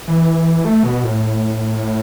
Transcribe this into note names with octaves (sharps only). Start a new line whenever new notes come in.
E3
A3
B2
A2